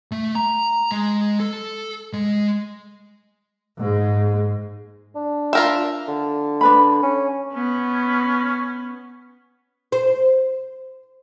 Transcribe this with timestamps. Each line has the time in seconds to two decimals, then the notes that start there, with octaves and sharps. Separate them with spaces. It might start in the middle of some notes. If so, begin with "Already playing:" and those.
0.12 A3
0.35 A#5
0.92 G#3
1.40 A4
2.13 G#3
3.78 G#2 G#3
5.15 D4
5.53 F4 A#4 E5
6.08 D3
6.61 D4 B4 B5
7.02 C#4
7.53 B3 C#4
9.92 C5